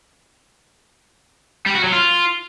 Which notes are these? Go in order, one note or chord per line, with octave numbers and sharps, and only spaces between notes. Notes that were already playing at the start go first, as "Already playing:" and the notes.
G3
F#4
F#3
F4